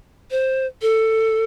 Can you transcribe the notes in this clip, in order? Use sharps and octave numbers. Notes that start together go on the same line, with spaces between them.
C5
A4